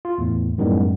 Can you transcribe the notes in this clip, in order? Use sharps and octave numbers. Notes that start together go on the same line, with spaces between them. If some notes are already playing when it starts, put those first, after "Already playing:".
F4
E2 A2
F#2 A2 D#3 G3 G#3 B3